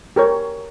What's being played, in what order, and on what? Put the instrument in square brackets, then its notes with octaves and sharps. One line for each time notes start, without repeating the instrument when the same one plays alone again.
[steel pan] G4 A#4 C#5